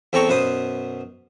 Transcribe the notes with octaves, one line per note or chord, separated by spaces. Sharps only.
E2 C4 A4 G5 A#5 C#6
F#2 B2 C5 B5 D#6